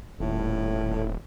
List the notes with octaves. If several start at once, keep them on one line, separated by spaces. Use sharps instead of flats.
D#1 A2